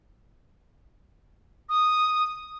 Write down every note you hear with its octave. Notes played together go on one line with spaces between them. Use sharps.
D#6